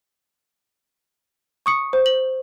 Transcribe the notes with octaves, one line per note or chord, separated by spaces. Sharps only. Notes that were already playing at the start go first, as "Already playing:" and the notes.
C#6 D#6 C#7
C5
F#7